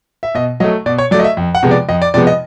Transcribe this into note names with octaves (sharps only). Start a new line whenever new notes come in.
E5
B2 D#5
F#3 A3 D#5
B2 D5
C#5
F#3 A3 D5
D#5
E5
F2
F#5
C3 F3 G#3 B3
D5
F2 D#5
D5
C3 F3 G#3 B3 D5
D#5